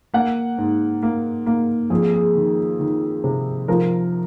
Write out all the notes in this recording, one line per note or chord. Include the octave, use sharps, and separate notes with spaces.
A#3 F#5
G#2
A#3
A#3
F2 G#4
G#4
D#3
D#3
C3
F3 A#4